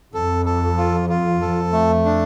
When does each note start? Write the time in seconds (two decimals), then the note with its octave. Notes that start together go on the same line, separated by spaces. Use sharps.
0.14 F2 A4
0.46 A4
0.78 F4
1.09 F4
1.41 F2 A4
1.73 A3
2.05 D4